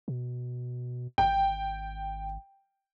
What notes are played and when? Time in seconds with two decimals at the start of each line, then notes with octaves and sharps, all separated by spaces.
0.08 B2
1.18 G#1 G5